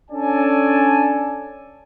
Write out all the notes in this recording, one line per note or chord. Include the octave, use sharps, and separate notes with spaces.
C#4 D4 A4 D5 G#5 A5